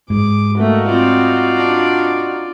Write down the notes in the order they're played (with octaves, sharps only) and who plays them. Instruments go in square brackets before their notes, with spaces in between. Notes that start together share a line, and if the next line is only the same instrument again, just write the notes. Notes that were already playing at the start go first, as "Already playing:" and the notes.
[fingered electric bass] G#2 [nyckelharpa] G#4 D6
[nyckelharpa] A3 A#3 [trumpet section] D#4 F#4 F5
[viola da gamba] C4 [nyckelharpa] F4 D5
[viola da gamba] D4